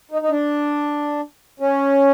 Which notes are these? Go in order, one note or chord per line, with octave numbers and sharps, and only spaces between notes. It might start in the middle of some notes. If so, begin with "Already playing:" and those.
D#4
D#4
D4
C#4